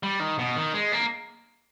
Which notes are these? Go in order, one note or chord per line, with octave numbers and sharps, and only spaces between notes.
G3
D#3
B2
D#3
G#3
A#3